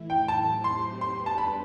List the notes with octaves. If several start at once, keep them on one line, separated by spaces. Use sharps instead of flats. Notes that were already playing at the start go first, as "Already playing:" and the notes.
Already playing: A2 E3 A3 E4
G5
A2 F#3 C4 G4 C5 A5
C6
G3 B3 D4 G4 B4 C6
A5
B5